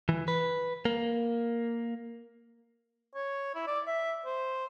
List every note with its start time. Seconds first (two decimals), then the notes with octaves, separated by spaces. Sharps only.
0.09 E3
0.28 B4
0.85 A#3
3.15 C#5
3.55 E4
3.67 D5
3.87 E5
4.26 C5